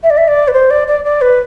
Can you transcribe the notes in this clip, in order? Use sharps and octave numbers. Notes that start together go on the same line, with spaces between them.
E5
D5
E5
D5
B4
C5
D5
D5
D5
B4